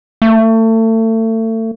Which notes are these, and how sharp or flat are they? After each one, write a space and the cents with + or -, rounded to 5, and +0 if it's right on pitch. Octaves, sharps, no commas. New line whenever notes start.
A3 +30